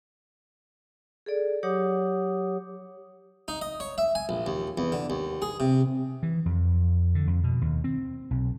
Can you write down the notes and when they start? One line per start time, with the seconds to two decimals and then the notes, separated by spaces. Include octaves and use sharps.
1.26 G#4 A4 D5
1.63 F#3 G4 C#5 F#5 D6 D#6
3.48 D#4
3.61 D#5
3.80 C#5
3.98 E5
4.15 G#5
4.29 A#1
4.46 D#2
4.78 E2
4.92 D3
5.10 D#2
5.42 G#4
5.60 C3
6.23 E3
6.46 F2
7.15 D3
7.27 F2
7.44 B2
7.61 D#2
7.84 C4
8.31 B1